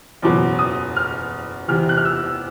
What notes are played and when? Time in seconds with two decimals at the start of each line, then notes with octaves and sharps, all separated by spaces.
0.22 F#1 E2 B2 F#3 D6
0.59 D#6
0.96 F6
1.68 E2 C3 E3 F6
1.89 F#6
1.97 F6
2.05 E6